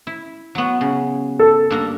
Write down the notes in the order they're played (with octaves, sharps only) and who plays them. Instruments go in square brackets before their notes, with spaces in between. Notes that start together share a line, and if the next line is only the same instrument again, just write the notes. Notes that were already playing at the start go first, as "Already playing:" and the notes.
[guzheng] E4
F#3 B3
C#3
[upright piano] A4
[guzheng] G2 A#3 A#5